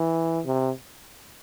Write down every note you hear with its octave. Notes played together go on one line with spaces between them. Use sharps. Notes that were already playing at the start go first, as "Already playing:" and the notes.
Already playing: E3
C3